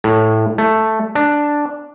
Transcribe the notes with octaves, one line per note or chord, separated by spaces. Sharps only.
A2
A3
D4